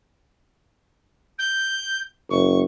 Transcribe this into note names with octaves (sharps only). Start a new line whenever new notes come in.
G6
F#1 C#6